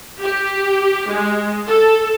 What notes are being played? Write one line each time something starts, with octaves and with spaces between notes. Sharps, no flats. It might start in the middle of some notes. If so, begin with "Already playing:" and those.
G4
G#3
A4